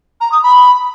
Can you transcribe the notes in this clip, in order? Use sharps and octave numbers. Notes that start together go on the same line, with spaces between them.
A#5
D#6
B5